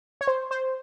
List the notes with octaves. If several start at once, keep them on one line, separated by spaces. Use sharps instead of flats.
C#5
C5
C5